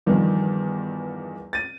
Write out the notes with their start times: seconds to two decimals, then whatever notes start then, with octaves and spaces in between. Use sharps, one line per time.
0.06 E2 G2 D#3 F3
1.53 A6 D#7